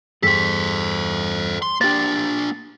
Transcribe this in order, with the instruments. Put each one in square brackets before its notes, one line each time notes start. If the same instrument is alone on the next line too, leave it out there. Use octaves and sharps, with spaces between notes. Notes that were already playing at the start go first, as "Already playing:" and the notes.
[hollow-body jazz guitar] E2 G2 G#4 [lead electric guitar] A4 C5 [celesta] B6
[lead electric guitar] C6
[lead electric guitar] A#3 D4 [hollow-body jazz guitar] G4 C5 [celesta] A6